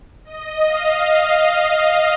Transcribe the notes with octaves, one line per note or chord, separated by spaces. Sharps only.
D#5
F5